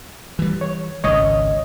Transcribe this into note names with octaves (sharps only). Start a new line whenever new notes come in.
E3 G3
C#5
G#1 C#2 C#5 D#5 D#6